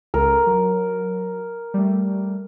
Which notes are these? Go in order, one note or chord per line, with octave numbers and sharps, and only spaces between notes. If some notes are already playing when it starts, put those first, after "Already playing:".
C#2 A4 A#4
F#3
G3 A3